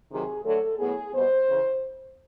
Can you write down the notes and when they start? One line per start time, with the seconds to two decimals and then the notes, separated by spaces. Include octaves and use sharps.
0.11 C3 D#3 F#3 G#4
0.45 D3 F#3 A3 A4
0.79 A2 F#3 B3 G#4
1.13 B2 G3 B3 C5
1.47 C#3 E3